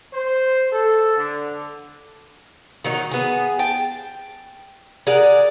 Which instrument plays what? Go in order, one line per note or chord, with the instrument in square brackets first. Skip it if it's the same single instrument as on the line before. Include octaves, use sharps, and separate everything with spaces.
[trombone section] C5
A4
D3
[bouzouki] D#3 F#3 D#4
B3 G#4
G5 A5
G#4 A#4 D5 F#5